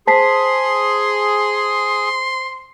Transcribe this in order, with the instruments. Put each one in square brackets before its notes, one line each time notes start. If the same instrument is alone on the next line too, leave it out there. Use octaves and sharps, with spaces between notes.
[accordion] G#4 [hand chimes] C5 [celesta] A5 B6 C7 [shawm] C6